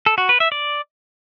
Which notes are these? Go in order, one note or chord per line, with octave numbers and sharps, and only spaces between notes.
A4
F#4
B4
E5
D5